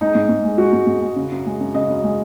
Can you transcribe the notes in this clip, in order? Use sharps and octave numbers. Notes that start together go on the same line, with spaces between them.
G#3 D#4
G#2
G#2
G#3
G#3 F#4
G#2
G#2
G#3
C#3
F#2
G#3
F#2
C#3 D#5
F#2
G#3